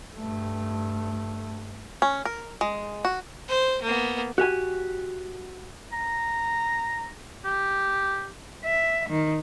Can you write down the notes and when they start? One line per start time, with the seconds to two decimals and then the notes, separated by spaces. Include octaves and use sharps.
0.15 G2 A3
2.02 C#4
2.25 A#4
2.61 G#3
3.05 F#4
3.48 C5
3.82 A#3 B3
4.38 F#4 G4 G#5
5.93 A#5
7.45 G4
8.65 E5
9.09 D#3